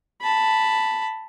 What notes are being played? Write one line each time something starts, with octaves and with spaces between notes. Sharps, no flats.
A5 B5